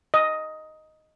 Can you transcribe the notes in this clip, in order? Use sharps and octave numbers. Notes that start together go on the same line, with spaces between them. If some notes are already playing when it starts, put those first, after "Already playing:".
D#5